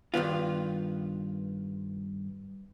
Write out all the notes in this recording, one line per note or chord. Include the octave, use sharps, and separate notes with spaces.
G2 D#3 B3 F4